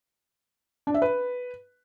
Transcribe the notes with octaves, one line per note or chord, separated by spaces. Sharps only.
D4
E5
B4